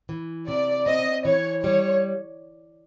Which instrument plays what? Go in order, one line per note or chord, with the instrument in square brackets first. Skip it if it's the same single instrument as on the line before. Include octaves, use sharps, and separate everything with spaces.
[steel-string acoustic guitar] E3
[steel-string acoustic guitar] C3 [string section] D5
[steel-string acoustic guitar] C4 [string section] D#5
[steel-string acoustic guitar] E3 [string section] C#5
[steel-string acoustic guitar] G3 [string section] C#5